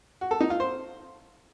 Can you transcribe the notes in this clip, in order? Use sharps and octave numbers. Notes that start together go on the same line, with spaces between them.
F#4
A4
D#4
F4
C5